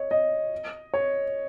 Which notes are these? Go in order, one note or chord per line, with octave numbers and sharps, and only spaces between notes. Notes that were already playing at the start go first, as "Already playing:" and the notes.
Already playing: C#5 D#5
D#5
C#5